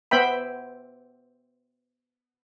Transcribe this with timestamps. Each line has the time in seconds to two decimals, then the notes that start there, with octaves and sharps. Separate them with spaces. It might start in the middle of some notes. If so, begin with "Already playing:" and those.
0.11 B3 C5 E5 G5 B5